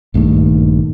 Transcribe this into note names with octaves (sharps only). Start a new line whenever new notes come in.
A#1 G2 D#3 A3